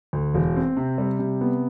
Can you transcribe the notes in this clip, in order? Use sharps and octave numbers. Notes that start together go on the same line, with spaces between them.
D2
E1
C4
C3
G3
C3
B3